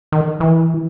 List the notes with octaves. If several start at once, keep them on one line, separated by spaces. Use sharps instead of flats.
D#3
E3